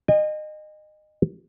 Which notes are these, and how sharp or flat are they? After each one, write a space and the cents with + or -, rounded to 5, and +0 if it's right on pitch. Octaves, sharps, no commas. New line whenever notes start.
D#5 -25 G#5 -45